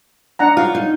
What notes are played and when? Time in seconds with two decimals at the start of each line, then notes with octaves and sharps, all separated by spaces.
0.39 D4 F#5 A#5
0.57 F4 C#5 F5
0.75 D#4